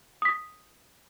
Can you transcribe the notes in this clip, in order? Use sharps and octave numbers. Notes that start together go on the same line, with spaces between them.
D#6 B6